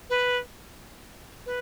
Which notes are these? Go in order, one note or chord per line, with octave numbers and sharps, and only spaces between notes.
B4
B4